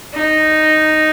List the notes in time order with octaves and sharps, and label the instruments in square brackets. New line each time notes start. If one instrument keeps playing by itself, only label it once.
[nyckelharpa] D#4